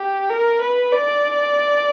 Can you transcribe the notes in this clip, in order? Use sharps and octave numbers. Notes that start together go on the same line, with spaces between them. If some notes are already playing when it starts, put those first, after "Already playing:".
Already playing: G4
A#4
B4
D5